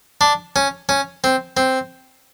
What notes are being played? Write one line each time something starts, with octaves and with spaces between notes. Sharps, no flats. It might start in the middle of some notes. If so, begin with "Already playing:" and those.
D4
C#4
C#4
C4
C4